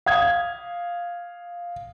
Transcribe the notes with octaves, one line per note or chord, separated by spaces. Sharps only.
F5 D#6 G#6